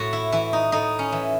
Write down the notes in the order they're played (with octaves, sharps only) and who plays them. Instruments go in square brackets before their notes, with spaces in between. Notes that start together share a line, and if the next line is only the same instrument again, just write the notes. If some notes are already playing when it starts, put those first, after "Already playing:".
Already playing: [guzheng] A2 F#4
E4
E3 E4
D#4
A2 D#4
C#4
E3